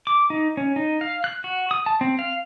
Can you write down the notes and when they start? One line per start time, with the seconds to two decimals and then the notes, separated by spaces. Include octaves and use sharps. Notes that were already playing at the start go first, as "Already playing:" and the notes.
0.07 D6
0.30 D#4
0.57 C#4
0.76 D#4
1.01 F5
1.24 F#6
1.44 F#4
1.71 D#6
1.86 A5
2.01 C4
2.19 F5